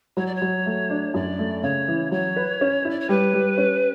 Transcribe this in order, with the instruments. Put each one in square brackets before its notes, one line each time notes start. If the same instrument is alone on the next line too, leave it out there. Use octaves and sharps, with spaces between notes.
[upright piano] F#3 [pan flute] C#5
[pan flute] D5
C#5
[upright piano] F#3
A3
D4
[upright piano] F#2 [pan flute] D5
[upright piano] A3
[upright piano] C#3 [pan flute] C#5
[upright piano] E3
[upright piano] F#3 [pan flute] C#5
[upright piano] B4
C#4
[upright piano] E4 [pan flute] D5
[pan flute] C#5
[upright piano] G3 [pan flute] B4
[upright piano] G3
C#4